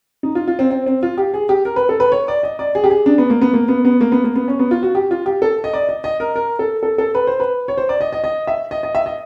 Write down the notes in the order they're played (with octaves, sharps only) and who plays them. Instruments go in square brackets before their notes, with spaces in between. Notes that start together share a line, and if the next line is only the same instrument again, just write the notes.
[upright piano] D#4
F4
F4
C4
C4
C4
F4
G4
G#4
G4
A#4
B4
A4
B4
C#5
D5
D#5
D5
G#4
G4
G#4
D4
B3
A#3
B3
A#3
B3
B3
A#3
B3
A#3
B3
C#4
B3
F4
F#4
G4
F4
G4
A4
D#5
D5
D#5
D#5
A#4
A#4
A4
A4
A4
B4
C5
B4
C#5
C5
D5
D#5
D#5
D#5
E5
D#5
D#5
E5
D#5